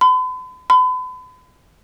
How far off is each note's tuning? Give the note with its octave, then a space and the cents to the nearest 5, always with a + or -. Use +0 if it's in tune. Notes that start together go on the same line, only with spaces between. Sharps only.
B5 +45
B5 +40